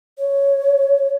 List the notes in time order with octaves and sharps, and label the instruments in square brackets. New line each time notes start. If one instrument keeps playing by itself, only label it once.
[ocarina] C#5